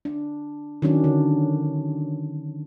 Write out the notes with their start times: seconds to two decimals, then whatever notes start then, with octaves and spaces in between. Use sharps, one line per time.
0.05 D4
0.82 D#3 F#3 C#4 D4
1.04 D3